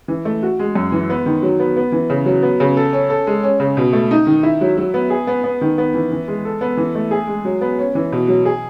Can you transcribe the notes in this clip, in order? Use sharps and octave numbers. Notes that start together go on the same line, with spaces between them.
E3
A3
F#4
G#3
F#2
E3
B3
D#3
F#3
B3
B3
E3
C#3
F#3
B3
C#3
A4
C#4
A4
G#3
C#4
C#3
B2
A3
D#4
D#3
E4
F#3
F#3
B3
G#4
B3
B3
D#3
B3
E3
E3
G#3
A4
B3
E3
A3
G#4
G#3
F#3
B3
C#4
E3
B2
F#3
G#4